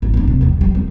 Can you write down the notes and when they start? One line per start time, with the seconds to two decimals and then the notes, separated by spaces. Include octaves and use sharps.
0.02 A1 G2
0.14 C#4 D4
0.28 F#1 C3
0.41 E2 G2
0.61 G3
0.75 F2 D#3